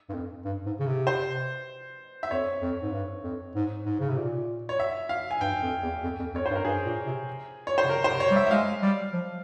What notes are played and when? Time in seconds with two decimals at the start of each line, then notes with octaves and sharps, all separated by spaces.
0.09 G2
0.13 F2
0.45 G2
0.65 G#2
0.79 C#3
0.86 C3
1.07 C5
2.23 E5
2.31 F2 C#5
2.61 F2
2.82 G#2
2.92 G2
3.23 F2
3.55 G#2
3.85 G#2
4.00 C#3
4.09 C3
4.17 A#2
4.69 C#5
4.80 E5
5.09 F5
5.31 G#5
5.41 G2 G5
5.62 F2
5.82 E2
6.03 F2
6.19 F2
6.34 F2 C#5
6.46 G2 C5
6.55 A#4
6.65 G2 G#4
6.86 A#2
7.06 C3
7.67 C#5
7.78 C5
7.84 C3
7.89 C#3 A#4
8.04 C5
8.10 C3
8.20 C#5
8.31 G3
8.36 E5
8.47 E5
8.51 G#3 F5
8.82 G3
9.13 F3